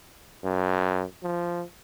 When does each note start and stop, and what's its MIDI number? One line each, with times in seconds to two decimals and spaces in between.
0.44 1.04 42
1.23 1.64 53